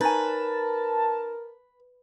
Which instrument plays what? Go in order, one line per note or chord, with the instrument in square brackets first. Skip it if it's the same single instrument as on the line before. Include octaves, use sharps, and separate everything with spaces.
[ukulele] D#4 C#5 G#5 [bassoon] A#4 [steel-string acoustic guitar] B4 [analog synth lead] A5